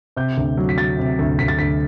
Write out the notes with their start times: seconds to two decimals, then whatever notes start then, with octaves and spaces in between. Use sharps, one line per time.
0.17 C3 G6
0.37 D2
0.57 F#3
0.69 B6
0.78 F#3 A6
0.99 C3
1.19 D2
1.39 D2 B6
1.48 A6
1.59 D2 B6